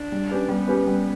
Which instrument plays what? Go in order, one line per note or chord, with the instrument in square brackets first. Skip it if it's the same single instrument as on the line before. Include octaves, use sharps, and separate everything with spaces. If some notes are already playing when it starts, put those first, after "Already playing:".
Already playing: [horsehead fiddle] D4
[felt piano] G3
C#4 G4 B4
[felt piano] G3 [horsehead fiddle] B3
[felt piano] C#4 G4 B4
G3